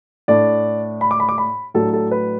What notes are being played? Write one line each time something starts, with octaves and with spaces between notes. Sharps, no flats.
A2 A3 D4 D5
B5
D6
B5
D6
B5
A2 F#3 D4 A4
A4
B4